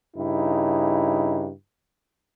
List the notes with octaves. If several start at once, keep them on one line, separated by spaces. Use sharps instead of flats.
G2 C#3 D#4 E4